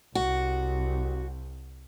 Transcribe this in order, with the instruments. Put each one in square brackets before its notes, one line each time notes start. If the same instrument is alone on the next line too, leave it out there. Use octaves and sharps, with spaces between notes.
[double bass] C2 [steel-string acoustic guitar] F#4